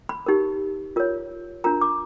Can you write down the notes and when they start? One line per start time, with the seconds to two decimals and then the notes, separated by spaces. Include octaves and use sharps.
0.09 B5
0.26 D#4 G4 A#4
0.96 F4 A#4 C#5
1.64 D4 F4 A#4 A#5
1.81 D6